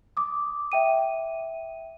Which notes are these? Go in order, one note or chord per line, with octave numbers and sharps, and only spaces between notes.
D6 D#6
E5 G5 D#7